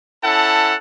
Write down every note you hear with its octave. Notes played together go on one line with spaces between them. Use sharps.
C#4 E4 A4 F#5 A5